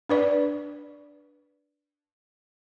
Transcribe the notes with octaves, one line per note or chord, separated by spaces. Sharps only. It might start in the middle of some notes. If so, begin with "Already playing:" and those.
D4 B4 D5